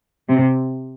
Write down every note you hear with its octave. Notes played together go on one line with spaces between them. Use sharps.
C3